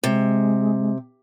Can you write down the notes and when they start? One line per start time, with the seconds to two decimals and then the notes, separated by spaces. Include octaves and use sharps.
0.04 C3 G#3